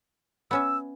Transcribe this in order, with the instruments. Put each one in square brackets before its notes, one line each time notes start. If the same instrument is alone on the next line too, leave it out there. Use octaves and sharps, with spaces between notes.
[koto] B3 C#4 E5 [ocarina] E6